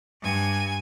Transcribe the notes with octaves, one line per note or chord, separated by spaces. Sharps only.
G2 G#5